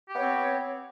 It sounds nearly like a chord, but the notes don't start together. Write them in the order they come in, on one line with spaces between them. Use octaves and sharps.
G4 B3 C#5 C4